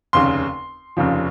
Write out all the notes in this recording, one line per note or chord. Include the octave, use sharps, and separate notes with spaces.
F1 D#2 C#3 C6
F1 D#2 C#3 F3